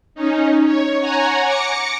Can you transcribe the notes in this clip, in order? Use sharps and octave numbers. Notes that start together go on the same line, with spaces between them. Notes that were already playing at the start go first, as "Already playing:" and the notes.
C#4 D#4
C#5
C#5 F#5 G#5 A#5
D6 A#6 C#7